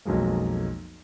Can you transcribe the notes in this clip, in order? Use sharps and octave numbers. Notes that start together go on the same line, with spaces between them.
B1 F2 F#3 G#3 A#3